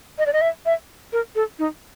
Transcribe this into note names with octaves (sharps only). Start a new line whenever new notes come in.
D#5
D5
D#5
E5
E5
A#4
A4
D#4